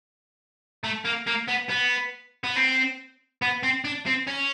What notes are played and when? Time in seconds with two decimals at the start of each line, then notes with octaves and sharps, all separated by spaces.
0.84 A3
1.05 A#3
1.27 A#3
1.48 B3
1.69 B3
2.44 B3
2.56 C4
3.42 B3
3.63 C4
3.85 D4
4.07 C4
4.28 C#4